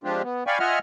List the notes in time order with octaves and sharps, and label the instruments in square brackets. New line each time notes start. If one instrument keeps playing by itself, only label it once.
[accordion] F3 G#3 C4 D4 F4 G4
B3
D5 F5 G5 G#5 B5 C#6
F4 D#5 E5 F#5 G#5 F6